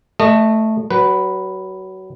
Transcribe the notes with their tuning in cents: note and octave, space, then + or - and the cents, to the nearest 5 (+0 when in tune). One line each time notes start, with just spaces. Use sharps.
A3 +0 D#5 -30
F#3 +25 B4 +0